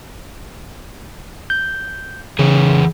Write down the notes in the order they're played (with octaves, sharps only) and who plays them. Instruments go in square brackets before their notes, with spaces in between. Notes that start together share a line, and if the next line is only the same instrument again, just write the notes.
[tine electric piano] G6
[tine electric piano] C#3 [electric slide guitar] E3 G#4 C#5